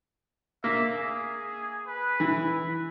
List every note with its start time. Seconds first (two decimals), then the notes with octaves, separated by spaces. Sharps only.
0.64 A#3 E5
0.94 G#4
1.87 B4
2.20 E3